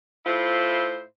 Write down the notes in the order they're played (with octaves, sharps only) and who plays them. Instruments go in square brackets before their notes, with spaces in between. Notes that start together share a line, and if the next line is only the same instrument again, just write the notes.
[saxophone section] A2 E4 F4 C5